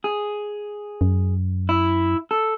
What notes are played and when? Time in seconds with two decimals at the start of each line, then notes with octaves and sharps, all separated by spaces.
0.04 G#4
1.01 F#2
1.69 E4
2.31 A4